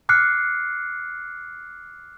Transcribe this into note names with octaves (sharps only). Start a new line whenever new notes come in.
D6 F6 F#6 C7 C#7